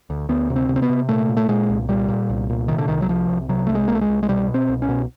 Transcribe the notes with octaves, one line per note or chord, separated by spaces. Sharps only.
D2
D2 B3
C3
C4
C3
C4
B3
C3
A#2 A3
A#2
A3
A#2 G#3
C2
A#2 G3
A#2
C2
A#2
C3 D#3
D3
C2 D#3
F#3
C3 F3
C2
C3 F#3
C2 A3
G#3
C2 A#3
A3
G#3
C2
G#3
B2 G3
B2
C4
C2
C#4
B2